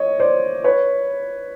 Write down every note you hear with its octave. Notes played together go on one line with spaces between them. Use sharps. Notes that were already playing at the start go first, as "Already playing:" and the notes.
Already playing: C#5 D#5
C5 D5
B4 C#5